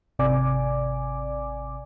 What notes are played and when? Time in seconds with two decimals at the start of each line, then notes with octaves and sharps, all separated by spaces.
0.19 G#1 C3 D5 G#5 D6